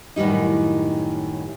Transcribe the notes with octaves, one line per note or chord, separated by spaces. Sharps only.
F#2 A2 D#3 G3 D#4